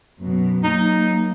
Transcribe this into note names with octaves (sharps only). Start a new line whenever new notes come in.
F#2 B2
F#3 A#3 D#4